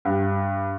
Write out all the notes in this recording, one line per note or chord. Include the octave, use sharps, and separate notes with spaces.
G2